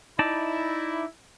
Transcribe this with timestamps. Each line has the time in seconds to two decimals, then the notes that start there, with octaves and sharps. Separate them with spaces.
0.19 D#4 E4 D5 A5